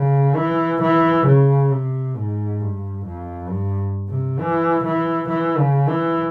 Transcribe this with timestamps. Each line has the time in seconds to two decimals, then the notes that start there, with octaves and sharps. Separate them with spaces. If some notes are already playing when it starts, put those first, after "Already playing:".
Already playing: C#3
0.36 E3
0.81 E3
1.26 C#3
1.71 C3
2.16 G#2
2.60 G2
3.05 F2
3.49 G2
4.09 C3
4.39 E3
4.84 E3
5.28 E3
5.58 C#3
5.88 E3